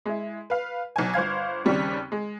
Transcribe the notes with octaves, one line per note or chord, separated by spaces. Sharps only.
G#3 E4
B4 F5
B1 G#5
G1 C5 F5 G#6
D#2 C#3 G3 C4
G#3